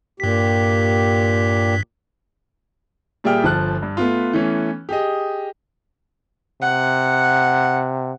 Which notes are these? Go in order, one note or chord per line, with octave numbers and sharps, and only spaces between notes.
G2 A#2 G4 B6
A#2 G3 G#4 E5 G5 F6
G1 F3 A5 F#6
G2
A3 B3 F4
E3 A3 B3 C#4
G4 G#4 D#5
C3 F#5